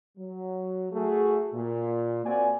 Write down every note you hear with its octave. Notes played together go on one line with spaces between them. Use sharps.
F#3
A3 F#4 G#4
A#2
A#3 C4 F#4 D5 G#5